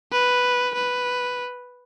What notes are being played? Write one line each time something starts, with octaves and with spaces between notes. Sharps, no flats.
B4
B4